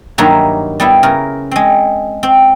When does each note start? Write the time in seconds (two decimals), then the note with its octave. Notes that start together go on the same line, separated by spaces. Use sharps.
0.18 G2 D#3 F#3 A#3 E5 A#5
0.80 G3 B3 E4
1.03 C#3 A#4
1.51 G#3 C4
2.23 C4